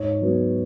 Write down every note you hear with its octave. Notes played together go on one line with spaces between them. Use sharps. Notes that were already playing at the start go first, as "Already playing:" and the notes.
Already playing: G#2 C#5
F#3 B3